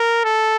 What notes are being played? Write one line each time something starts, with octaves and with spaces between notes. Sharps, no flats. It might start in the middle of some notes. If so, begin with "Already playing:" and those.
Already playing: A#4
A4